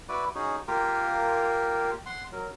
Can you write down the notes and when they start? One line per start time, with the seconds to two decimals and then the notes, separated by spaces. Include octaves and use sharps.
0.09 E4 F#4 B4 D5
0.35 C#4 D#4 F#4 G#4
0.68 A#3 F4 G4 A#4
2.06 F#5 C6
2.32 F#3 A#4